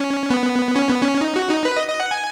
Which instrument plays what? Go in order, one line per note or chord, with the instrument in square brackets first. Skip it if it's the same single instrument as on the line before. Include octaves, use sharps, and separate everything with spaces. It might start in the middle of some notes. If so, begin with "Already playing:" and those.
Already playing: [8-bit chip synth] C#4
B3
C#4
B3
C#4
D#4
F#4
D#4
B4
D#5
D#5
F#5
G#5